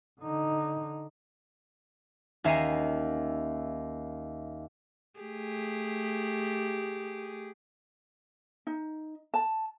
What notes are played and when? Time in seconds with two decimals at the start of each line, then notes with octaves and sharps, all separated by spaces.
0.21 D3 D#4
2.44 D#2 C#4 E5 A#5 C7 D#7
5.20 A3 G4 G#4
8.67 D#4
9.34 A5